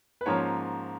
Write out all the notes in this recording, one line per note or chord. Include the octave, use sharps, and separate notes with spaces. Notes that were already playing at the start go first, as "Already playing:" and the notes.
B4
G#2 F3 A#3 C#4 C#5